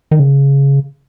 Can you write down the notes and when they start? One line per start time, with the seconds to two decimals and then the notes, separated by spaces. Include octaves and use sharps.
0.11 D#3
0.19 C#3